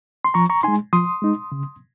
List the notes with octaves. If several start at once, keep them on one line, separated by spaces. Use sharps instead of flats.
C6
F3 A#5 C#6
A#5 C#6
G#3 D#4 G#5 C6
F3 C6 D#6
G#3 D#4
C#3